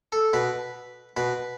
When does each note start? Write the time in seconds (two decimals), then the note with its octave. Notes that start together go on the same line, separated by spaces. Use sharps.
0.12 A4
0.33 B2 B4
1.17 B2 B4